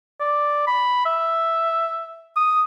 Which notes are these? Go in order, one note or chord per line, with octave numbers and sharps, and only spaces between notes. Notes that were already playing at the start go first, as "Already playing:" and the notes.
D5
B5
E5
D#6